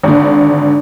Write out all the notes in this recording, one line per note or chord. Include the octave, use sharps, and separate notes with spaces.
G#1 D3